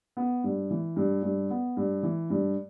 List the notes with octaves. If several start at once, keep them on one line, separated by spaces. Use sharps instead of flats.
B3
G2
E3
G2
G2
B3
G2
E3
G2